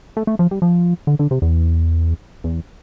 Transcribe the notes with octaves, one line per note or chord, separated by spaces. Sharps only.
A3
A3
F3
G3
F3
D3
D3
C3
E2
E2